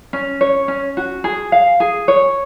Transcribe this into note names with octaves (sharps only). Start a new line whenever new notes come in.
C#4
C#5
C#4
F#4
G#4
F5
G#4
C#5